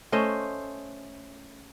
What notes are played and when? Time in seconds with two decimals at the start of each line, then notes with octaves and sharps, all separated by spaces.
0.12 A3 C#4 C5 D#5